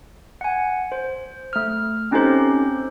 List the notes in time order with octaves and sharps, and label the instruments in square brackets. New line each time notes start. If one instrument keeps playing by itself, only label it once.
[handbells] F#5 G#5
C5
A3 F6
C4 C#4 D#4 G4 A4 C5